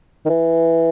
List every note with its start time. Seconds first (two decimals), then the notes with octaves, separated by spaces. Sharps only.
0.26 D#3
0.30 E3